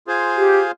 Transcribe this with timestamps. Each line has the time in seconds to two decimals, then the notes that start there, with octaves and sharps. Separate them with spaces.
0.07 F4 G#4 C5 F5 G#5
0.37 G4